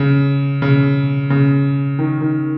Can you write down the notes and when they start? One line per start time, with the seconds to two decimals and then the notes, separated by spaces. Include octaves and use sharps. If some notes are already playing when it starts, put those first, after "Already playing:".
Already playing: C#3
0.62 C#3
1.30 C#3
1.99 D#3
2.21 D#3